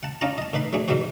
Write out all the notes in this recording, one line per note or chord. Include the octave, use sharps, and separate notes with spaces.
F#5 A5
C#4 D4 F4 D#5 A5 A#5
D#5 A5
A2 D#4 B4 B5 C6
F#3 A3 D4 G#4
G#2 B2 F#3 G3 F#4 C5